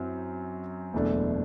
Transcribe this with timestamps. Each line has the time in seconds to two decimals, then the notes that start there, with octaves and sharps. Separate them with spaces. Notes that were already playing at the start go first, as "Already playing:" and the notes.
Already playing: F#2 F#3 C4 E4
0.93 F#1 E2 B2 A3 D4